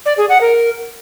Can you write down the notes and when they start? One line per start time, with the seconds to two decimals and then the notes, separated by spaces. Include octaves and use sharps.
0.06 D5
0.17 G#4
0.29 F#5
0.41 A#4